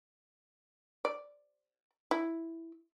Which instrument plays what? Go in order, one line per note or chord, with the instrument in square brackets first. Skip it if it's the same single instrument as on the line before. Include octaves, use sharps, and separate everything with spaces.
[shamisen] D5
E4